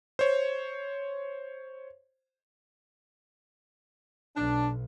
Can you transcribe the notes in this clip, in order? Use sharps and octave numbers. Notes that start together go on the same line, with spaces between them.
C5 C#5
B1 D4